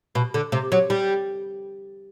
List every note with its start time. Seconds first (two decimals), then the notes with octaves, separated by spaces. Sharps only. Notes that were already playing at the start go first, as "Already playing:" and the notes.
0.15 B2
0.34 D3
0.52 C3
0.72 F#3
0.90 G3